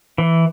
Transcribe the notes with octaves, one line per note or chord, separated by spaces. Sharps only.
E3